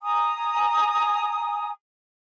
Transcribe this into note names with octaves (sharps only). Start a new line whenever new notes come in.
G#5 A#5 D#6